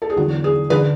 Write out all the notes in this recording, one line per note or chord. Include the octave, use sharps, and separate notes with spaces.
A4
G#4
E2 D3 F#3 F#4
G#4
D3 G#4 B4